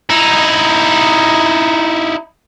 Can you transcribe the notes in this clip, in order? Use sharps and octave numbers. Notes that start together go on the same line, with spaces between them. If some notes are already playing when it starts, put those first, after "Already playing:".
D#4 E4